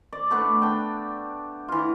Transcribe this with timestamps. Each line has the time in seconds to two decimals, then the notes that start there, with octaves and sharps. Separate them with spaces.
0.12 D5
0.31 A3 B3 D4
0.62 D4 G5
1.68 E3 F4